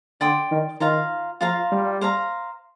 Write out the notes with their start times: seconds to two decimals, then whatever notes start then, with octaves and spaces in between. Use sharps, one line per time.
0.20 D3 D5 G5 C6 D#6
0.51 D#3
0.80 D#3 F4 C5 F5 A#5
1.41 F3 F4 C5 F5 A#5
1.72 G3
2.01 C5 F5 A#5